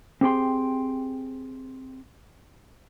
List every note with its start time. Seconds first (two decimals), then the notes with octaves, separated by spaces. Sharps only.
0.21 C4 G4 G#4 G5 C6